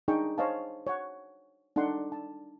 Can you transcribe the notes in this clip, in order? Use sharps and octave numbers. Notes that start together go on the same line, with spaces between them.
D4 D#4 G#4 G5 C#6
C5 C#5 D#5 F5 G#5 A5
C#5 F#5
D4 D#4 A4 F#5 C6
A5